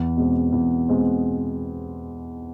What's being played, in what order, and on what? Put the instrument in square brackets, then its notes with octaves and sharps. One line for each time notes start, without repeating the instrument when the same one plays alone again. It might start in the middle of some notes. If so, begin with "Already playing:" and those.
Already playing: [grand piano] E2
B2 G#3 C4
E2
B2 G#3 C4